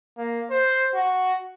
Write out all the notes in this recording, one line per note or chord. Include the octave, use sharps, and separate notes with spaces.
A#3
C5
F#4